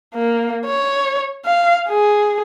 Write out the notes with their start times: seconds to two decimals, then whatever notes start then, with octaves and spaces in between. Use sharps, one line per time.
0.14 A#3
0.65 C#5
1.46 F5
1.89 G#4